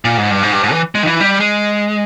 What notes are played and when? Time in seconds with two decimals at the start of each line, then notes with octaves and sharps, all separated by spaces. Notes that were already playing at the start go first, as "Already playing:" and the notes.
0.05 A#2
0.18 G#2
0.31 G2
0.43 G#2
0.52 G2
0.63 G#2
0.72 E3
0.95 G#3
1.03 D#3
1.07 E3
1.20 G3
1.40 G#3